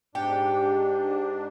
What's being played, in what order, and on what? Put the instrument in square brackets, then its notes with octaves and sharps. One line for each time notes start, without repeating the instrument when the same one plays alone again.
[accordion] G#2 D4 [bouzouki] G4 [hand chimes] G5